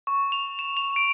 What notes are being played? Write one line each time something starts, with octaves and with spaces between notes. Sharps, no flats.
C#6
F7
E7
F7
D7